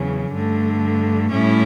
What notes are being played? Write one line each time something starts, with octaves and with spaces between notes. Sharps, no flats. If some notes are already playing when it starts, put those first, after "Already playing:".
Already playing: E2 C#3 F#3 C#4
G2 D3 A3
A2 G3 C#4 E4